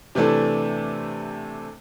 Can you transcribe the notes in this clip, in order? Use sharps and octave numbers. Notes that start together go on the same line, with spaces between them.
C3 E3 A3 D4 A4